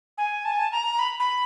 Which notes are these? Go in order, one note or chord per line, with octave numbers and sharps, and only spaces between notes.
G#5
A5
G#5
A5
A#5
B5
B5